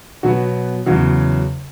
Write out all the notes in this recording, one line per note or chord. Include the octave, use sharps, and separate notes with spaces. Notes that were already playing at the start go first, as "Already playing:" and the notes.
B2 F#3 B3 F#4
E2 C#3 F#3 F#4